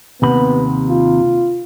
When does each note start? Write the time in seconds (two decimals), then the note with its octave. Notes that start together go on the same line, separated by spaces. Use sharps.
0.22 D#2 C3 B3 B5
0.90 F4